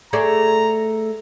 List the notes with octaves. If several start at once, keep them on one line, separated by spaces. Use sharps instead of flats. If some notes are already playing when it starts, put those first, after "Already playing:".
A3 G#4 D5 A#5